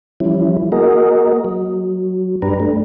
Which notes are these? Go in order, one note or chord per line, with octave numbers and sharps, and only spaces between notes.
E3 F3 G3 C#4 E4
A#3 F#4 G#4 A#4 D#5
F#3
G2 D4 G4 B4 A#5
A3 D4